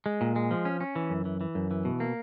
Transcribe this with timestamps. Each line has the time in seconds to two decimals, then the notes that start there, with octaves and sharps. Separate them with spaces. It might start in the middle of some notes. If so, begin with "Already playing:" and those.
0.06 G#3
0.21 A#2
0.36 G#3
0.51 F3
0.65 C#4
0.80 C#4
0.96 E3
1.10 F#2
1.25 E3
1.41 E3
1.55 F#2
1.71 E3
1.85 B2
2.00 A#3